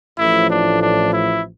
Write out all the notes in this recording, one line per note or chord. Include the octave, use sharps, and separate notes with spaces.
A1 A2 F3 E4
D4
D4
E4